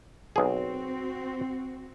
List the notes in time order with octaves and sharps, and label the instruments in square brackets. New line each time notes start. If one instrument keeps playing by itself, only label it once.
[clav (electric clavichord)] B1 G#4 [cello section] C4 F#4